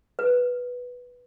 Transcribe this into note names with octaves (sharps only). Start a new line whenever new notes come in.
B4